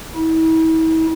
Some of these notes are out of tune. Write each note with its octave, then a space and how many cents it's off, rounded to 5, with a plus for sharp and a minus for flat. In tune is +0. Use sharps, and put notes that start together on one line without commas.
E4 -40